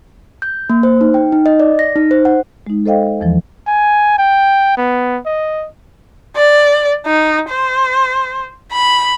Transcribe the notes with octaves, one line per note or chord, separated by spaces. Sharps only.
G6
A#3
C5
D#4
G5
D#4
D#5
D5
A#6
D#4
C5
F#5
G#3 D#4
A4 C5 D#5 F5 G5
E2 E3 F3
G#5
G5
B3
D#5
D5
D#4
C5
B5